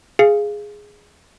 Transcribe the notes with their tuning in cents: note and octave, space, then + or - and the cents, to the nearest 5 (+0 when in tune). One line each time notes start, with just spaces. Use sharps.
G#4 +0 F5 -15